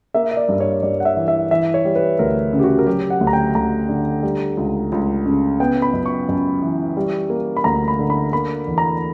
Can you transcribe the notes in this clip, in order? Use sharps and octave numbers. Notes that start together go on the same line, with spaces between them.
A#3 E5
E5
D5
G2
C#5
G2 D5
F#5
E5
E3
E5
E3 E5
C#5
G3
B4
D2 A#4
C#3
G4
F#4
A#4
F#3 G4
F#5
D2
A#5
G5
D2 A#5
D3
G3
C#2
C#2
C#3
B3 G5
B5
F#2
C#6
F#2
E3
G3
A#3
B5
D2 A#5
B5
D3
B5
A#3 B5
E2
A#5